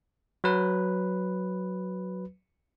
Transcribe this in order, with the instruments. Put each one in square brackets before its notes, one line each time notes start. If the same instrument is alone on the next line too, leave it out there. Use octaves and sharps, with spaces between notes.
[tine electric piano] F#3 B4